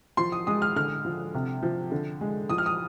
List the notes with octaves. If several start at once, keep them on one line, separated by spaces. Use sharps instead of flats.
F3 C6
D#6
G#3 D#6
F6
D3 F6
F3
C3
F3
D3
G#3
F3 D#6
F6
D#6